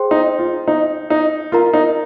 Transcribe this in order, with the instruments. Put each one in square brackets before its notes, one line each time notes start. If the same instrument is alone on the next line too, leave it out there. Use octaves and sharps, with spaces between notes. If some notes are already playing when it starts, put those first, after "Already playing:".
Already playing: [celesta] G#4 C5 G5 C6
[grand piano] D#4
F4
D#4
D#4
[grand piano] F4 [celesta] A#4 F5 A#5
[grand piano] D#4